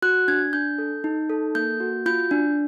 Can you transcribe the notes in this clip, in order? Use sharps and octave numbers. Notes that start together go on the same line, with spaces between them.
F#4 F#6
D4 G#6
D4 G6
A4
D#4
A4
A#3 G6
F#4
F4 G6
D4